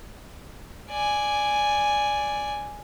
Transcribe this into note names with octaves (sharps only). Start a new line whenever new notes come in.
D5 G#5